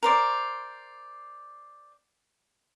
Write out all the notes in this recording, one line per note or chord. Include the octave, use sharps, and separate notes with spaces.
A#4 C5 D5